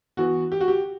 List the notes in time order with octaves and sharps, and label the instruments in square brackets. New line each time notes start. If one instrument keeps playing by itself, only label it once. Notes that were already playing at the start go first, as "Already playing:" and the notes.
[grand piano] E3 B3 F#4
G4
F#4
G4